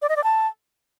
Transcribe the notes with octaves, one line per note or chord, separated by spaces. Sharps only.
D5
D#5
D5
A5